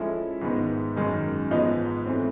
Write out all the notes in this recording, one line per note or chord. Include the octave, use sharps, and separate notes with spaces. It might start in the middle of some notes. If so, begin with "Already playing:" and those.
Already playing: F3 G#3 C#4 E4 A4
G#2 D#3 G#3 B3
F#2 D#3 G#3
G#2 F3 G#3 B3 D#4
E3 A3 C4